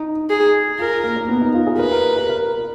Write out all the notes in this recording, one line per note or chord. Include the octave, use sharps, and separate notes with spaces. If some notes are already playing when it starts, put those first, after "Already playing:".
Already playing: D#4
G#4
F4 A#4
A#3
A#3
B3
D#4
F4
G#4
A#4 B4
A#4
A#4
A#4